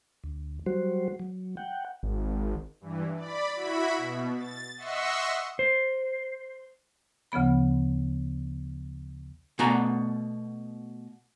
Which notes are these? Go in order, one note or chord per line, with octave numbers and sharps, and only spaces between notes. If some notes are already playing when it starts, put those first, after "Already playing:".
D2
F#3 G3 F#4 C5
F#3
F#5 G5
G#1
G2 E3
D5 B5
E4 F#4 E5 B5
B2
A6
D#5 E5 F#5 C6 C#6 E6
C5
D2 C#3 F3 B3 B5
B2 A3 F#4 G#5 A#5